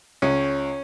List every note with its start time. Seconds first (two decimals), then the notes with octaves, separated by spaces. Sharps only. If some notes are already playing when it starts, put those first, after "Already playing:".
0.22 C#2 C#4